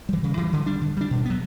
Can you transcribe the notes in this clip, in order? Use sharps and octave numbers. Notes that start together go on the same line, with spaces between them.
E3 G3
C#3
E3 G3
D3
G3 D4
D3
G3 D4
B2
F#3 B3